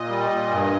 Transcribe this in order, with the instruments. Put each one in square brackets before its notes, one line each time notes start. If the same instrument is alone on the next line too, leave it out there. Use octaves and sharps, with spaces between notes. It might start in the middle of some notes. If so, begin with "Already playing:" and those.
Already playing: [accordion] A#2 [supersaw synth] D#5
[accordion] G3
A#2
G2